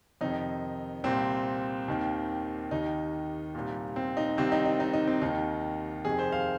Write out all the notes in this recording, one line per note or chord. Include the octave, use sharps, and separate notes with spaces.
F2 C3 D#3 D#4
C2 A#2 C4
D#2 D#3
D#2 D#3 D#4
C2 A#2
C4
D#4
C2 C3 D#3 C4
D#4
D#4
D#4
D#4
C4
D#2 D#3 D#4
F2 C3 D#3 G#4
C5
F5